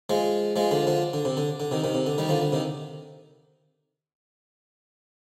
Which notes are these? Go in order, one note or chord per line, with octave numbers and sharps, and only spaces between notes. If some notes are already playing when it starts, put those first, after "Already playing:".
F3 G#3
F3 G#3
D3 F3
D3 F3
D3
C3
D3
D3
C3 D#3
C3 D#3
C3
D3
D#3 G3
D3 F3
D3
C3 D#3